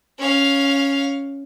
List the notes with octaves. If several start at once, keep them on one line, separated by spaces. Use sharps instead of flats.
C#4 F5